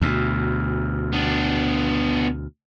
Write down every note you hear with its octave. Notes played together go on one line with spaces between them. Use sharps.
D2 B2
B3 D4